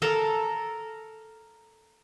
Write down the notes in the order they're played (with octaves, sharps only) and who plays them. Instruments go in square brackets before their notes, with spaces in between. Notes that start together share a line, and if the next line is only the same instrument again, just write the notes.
[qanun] A4 A#4 A#5